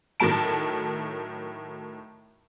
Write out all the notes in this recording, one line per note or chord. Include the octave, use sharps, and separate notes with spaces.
A2 D#3 F#3 A3 A5 D7